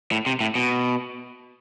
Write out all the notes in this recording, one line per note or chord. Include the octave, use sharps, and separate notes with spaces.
A2
C3
A2
B2